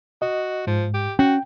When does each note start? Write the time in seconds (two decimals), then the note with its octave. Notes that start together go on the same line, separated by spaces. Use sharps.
0.22 F#4 D#5
0.67 G#2 F3
0.94 G4
1.19 C#4 F#4 G5